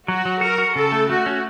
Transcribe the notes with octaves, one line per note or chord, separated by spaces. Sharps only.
F#3 F#4
F#3
F#4 A#4
F#4
C#3 A4
A3
A3 F#4
C#4